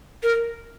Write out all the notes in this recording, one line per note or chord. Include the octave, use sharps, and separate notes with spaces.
A#4